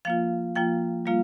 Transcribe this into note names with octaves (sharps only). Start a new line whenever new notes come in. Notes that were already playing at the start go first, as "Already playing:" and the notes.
F3 A#3 F4 F5
F3 A#3 F4 G5
G3 A#3 F4 F5